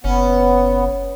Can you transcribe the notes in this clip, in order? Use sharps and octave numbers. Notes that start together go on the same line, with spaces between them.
F#1 B3 C#4